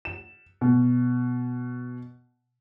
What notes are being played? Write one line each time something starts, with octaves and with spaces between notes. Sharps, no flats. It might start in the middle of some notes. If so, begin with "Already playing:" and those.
E7
B2